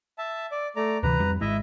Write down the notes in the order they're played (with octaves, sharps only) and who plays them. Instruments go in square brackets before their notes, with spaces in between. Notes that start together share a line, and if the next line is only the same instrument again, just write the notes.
[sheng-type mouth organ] E5 A5
D5
A3 D5 A#5
[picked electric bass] D2 C3 E3 [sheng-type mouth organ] B4 A#5
[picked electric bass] F2 G3
[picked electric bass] G#1 G#3 [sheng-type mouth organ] E4 D#5 E5